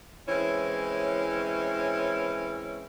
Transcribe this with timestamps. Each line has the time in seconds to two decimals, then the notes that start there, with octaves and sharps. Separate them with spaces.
0.28 E3 G#3 C4 C#4 E4 C#5